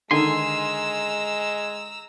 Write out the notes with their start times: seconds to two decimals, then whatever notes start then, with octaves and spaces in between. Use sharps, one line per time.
0.11 D3 D#3 G#3 G#5 A#5 C6 E6